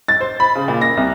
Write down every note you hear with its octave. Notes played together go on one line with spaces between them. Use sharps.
A6
C5
B5
C#3
A#2
A#6
C2